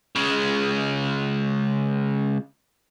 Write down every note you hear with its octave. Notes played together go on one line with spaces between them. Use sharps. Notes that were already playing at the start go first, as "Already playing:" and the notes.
C#3 G#3